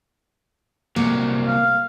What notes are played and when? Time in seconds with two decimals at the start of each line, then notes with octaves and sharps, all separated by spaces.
0.96 C2 F#3 A#3
1.47 F5